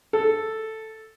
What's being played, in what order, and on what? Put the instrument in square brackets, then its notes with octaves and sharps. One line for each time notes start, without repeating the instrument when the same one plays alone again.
[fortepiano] A4